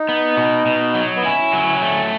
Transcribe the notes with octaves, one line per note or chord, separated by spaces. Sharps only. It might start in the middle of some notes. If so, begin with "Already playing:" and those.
Already playing: D#4
B3
B2
B2
F#3
B3
C#4 E4
F#3
A3